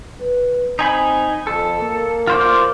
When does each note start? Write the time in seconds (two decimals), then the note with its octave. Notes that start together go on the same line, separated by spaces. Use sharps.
0.20 B4
0.79 C4 D#4 G#5 B5
1.47 F2 A4
1.81 A#3
2.27 F4 C5 D5